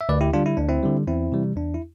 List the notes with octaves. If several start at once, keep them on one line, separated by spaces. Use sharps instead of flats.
E5
D2 B4 D5
E4 G4
D3 G3 D4 F4
E4
D2 D4
C4 E4
D3 G3
E2 C4 E4
C3 E3 G3
E2 D4
E4